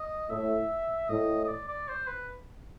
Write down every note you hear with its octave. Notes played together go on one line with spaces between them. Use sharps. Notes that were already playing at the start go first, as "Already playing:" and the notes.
Already playing: D#5
A2 E5
A2 D#5
D#5
D5
D5
C5
B4